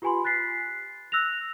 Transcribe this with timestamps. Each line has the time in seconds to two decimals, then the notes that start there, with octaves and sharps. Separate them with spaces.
0.02 F4 G4 B4 G#5 B5 C6
0.24 F#6 A6 B6 C7
1.12 E6 F#6 A#6 F7